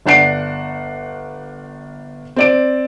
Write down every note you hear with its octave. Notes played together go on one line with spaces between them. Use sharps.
G1 D4 F#5 C7 D7
C4 D5 D7